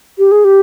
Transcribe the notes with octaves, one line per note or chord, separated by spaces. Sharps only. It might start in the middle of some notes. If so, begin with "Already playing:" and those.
G4
G#4
G4